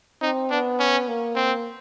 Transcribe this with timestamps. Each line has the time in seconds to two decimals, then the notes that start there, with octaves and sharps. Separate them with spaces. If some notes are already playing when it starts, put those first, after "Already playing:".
0.22 C4 D#4
0.51 B3 D4
0.80 C#4
1.08 A#3
1.36 C4